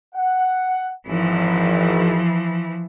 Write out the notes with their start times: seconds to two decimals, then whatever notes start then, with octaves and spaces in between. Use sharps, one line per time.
0.15 F#5
1.07 G#1 E3 F3